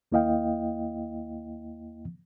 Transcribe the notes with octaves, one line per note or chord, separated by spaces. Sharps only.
D#2 A#3 E4 D#5 F5 G5